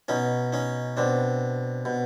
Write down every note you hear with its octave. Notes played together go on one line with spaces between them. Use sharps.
B2 C#4 D#4
C#4 D#4
B2 C4 D4
B2